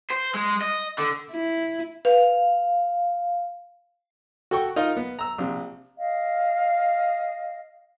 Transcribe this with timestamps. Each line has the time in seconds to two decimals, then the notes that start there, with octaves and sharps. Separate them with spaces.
0.10 C5
0.34 G#3
0.61 D#5
0.98 D3
1.31 E4
2.05 B4 F5
4.51 F#4 A4 G5 C#6
4.76 D#4 F4 A#4 F5
4.97 B3
5.19 A#5 E6
5.38 A#1 C3
5.98 D#5 F5